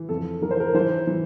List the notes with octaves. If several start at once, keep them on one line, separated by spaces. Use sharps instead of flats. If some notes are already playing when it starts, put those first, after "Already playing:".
Already playing: E3
F2 A4
E3 A#4
C5
A#4
E3 C5
E3